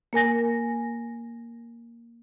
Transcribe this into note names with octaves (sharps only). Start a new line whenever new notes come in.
A#3 A#4 G#5 A#6